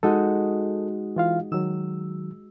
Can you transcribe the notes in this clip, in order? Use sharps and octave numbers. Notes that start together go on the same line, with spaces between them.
G#3 D#4 F#4 A4
E3 F4 F5
D#3 F#3 E6